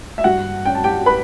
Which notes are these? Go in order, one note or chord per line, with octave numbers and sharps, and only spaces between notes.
E5
G2 F#4 F#5
C#4 G5
A5
G4 G5
B4 B5